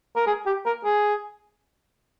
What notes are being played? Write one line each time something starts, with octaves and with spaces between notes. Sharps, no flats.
A#4
G#4
G4
A#4
G#4